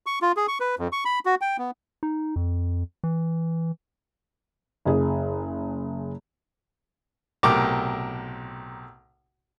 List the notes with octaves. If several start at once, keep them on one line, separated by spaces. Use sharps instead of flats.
C#6
F4
G#4
C#6
B4
F2
C#6
B5
F#4
G5
B3
D#4
F2
E3
F#1 G#4
B1 A2 C3 A#4 G5 D6